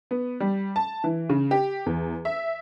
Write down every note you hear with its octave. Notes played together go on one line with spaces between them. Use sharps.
B3
G3
A5
E3
C#3
G4
E2
E5